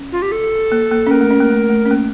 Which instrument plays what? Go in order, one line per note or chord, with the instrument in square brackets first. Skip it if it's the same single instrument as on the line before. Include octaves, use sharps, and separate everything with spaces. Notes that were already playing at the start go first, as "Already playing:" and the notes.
Already playing: [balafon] C#4
[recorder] F4
G4
A4
[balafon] A#3
A#3
C#4
[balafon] A#3 [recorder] A#4
[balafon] A3
C#4
A#3
A3
A3
C#4
A#3